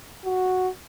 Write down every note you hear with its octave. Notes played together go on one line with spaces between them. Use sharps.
F#4